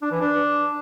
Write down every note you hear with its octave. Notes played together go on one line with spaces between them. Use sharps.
D4
E3
D4